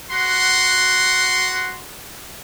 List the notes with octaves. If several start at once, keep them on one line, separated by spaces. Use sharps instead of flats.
F#4 F#5 C6